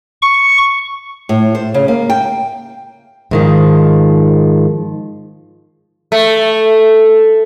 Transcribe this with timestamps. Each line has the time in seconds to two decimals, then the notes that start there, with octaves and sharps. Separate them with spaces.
0.22 C#6
1.29 A2
1.55 C5
1.74 C#3
1.88 A#3
2.10 G5
3.31 G#2 D#3 F3
6.12 A3